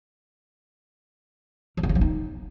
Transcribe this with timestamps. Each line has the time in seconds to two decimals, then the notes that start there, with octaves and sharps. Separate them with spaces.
1.77 D#3
1.83 D3
1.89 C#3
1.95 F#3
2.01 D#4